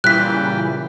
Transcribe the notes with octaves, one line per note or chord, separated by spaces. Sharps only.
A#2 C#3 E3 G3 F#6 B6